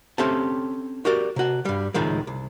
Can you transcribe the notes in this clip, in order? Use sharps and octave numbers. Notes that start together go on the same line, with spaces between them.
C4 C#4 G4 A4 E5 A5
F#4 G4 A#4 D5
C3 F#4
G2 G3
C#2 A2 D#3 F3 G#3
C2